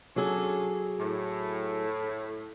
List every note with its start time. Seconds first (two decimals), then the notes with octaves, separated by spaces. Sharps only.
0.16 F#3 C#4 D4 G#4 A4
0.99 A2